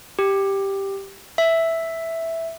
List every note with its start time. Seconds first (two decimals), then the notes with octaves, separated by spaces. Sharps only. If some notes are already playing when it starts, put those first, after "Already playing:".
0.19 G4
1.38 E5